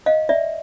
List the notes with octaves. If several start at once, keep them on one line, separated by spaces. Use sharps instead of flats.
D#5 F5
D5 E5